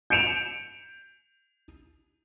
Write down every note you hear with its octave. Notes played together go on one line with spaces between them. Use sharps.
G6 C#7 D7 E7 F7